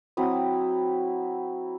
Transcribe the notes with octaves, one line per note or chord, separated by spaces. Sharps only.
F#3 C4 E4 D#6